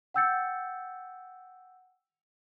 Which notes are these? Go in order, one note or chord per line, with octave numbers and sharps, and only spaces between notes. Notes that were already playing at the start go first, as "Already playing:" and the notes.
F#5 G5 E6 G6 A6 C#7